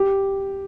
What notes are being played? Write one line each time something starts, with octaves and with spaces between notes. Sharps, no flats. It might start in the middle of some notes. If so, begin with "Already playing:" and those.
Already playing: G4